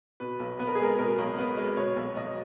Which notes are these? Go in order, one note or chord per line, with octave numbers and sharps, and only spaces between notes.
B2 B4
B1
B3 B4
A#4
G#4
G#3 A#4
B2 A#4
B1
B3 B4
G#3
B2 C#5
B1
B1 D#5